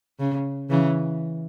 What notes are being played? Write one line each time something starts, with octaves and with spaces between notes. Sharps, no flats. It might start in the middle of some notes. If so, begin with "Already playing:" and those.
C#3
C#3 E3